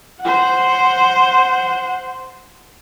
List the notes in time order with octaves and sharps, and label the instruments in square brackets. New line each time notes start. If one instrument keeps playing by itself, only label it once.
[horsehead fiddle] C5 F#5